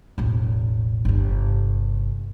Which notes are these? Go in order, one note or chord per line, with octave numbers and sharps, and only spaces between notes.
E1 A1
G1 C3